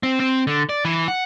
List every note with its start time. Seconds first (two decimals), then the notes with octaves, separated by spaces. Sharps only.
0.03 C4
0.20 C4
0.47 D3
0.69 D5
0.85 E3
1.08 F#5